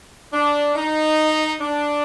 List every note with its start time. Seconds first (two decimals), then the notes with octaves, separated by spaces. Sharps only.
0.33 D4
0.76 D#4
1.61 D4